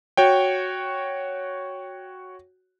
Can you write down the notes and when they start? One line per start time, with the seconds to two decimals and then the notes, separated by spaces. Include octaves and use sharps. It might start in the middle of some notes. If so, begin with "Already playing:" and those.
0.17 F#4 C#5 G5